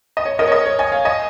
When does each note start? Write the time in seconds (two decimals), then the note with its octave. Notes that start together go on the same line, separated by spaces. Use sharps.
0.17 D#5
0.25 C#5
0.39 A#4 D#5
0.48 C#5
0.52 A#4 D#5
0.66 C#5
0.79 D#5 G#5
0.92 C#5 F5
1.05 D#5 G#5